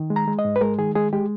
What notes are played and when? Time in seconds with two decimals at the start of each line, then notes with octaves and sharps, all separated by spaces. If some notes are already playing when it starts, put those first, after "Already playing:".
Already playing: D#3
0.10 G#3
0.16 A#5
0.28 G#3
0.39 D#5
0.45 G#2
0.56 B4
0.61 G#3 A#4
0.79 D#3 G#4
0.95 G#3 G#4
1.13 G#3 G4